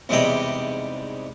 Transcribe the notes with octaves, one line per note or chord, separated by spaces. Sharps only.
E2 G#2 C3 G3 G4 D#5